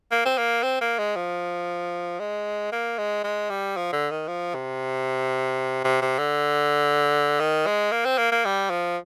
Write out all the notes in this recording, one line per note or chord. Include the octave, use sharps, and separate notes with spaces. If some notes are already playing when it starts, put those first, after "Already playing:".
A#3
C4
A#3
C4
A#3
G#3
F3
G#3
A#3
G#3
G#3
G3
F3
D3
D#3
F3
C3
C3
C3
D3
D#3
G#3
A#3
C4
A#3
A#3
G3
F3